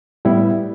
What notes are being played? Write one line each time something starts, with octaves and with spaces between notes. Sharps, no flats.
A2 G3 B3 E4